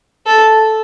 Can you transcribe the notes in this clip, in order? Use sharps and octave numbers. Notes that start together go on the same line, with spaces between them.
A4